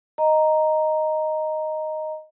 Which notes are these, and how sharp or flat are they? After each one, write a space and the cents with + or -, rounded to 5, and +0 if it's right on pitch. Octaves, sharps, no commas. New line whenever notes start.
D#5 +0 A#5 +0